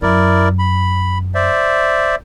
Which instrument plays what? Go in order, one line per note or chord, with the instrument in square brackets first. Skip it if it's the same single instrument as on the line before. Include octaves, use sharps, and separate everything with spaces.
[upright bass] F#2 [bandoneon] E4 A#4 D5
[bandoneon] B5
C5 D5 E5